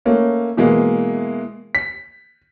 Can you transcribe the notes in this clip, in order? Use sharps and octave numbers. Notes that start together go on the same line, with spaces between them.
A3 A#3 C#4
B2 E3 G#3 A#3
B6